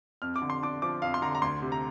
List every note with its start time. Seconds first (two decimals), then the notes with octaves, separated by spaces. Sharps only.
0.22 F2 F6
0.36 D6
0.42 D3
0.50 C6
0.63 D4 D6
0.82 F3 D6
1.02 F2 F5
1.14 C6
1.22 D3 A#5
1.35 A#5
1.42 D2 C6
1.62 C3
1.72 A#5